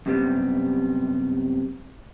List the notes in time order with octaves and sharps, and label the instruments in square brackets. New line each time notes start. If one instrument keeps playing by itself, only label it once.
[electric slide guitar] F#2 C3 G3 B3